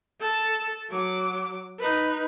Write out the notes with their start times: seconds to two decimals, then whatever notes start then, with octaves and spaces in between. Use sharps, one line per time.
0.20 A4 A5
0.90 F#3 D6
1.79 D#4 B4